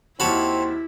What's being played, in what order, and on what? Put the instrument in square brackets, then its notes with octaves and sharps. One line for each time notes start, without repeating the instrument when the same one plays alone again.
[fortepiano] D#2 F#4 [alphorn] C4 [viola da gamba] E4 [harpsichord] C#5 A5 B5